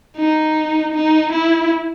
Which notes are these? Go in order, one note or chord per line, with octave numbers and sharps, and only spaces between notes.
D#4
D#4
E4